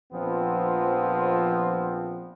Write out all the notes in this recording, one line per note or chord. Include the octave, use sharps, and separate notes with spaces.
A#1 F3 B3 C4